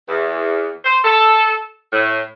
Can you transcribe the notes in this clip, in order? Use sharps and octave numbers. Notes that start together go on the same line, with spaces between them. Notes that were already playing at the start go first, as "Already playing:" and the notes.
E2
C5
A4
A2